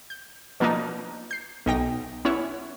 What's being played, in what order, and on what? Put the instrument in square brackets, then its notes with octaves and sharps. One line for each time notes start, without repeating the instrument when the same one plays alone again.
[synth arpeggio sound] G6
B2 F3 A#3 D4 D#4
G6 C7
B1 D#4 G5 A#6
B3 C#4 E4 C#5